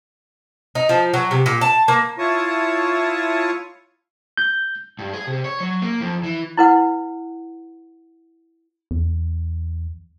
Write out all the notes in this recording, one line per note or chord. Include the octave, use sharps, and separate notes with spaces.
D#4
F3
F#3
C3
A#2
A5
A#3
E4 F4 C#5 A5 C#6 D#6
G6
G2
G#4
C3
C#5
F#3
A#3
F2
E3
E4 B4 F#5
E2